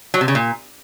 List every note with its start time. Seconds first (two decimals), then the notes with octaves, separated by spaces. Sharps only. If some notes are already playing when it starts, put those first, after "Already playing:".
0.14 F#3
0.21 C3
0.28 C#3
0.35 A#2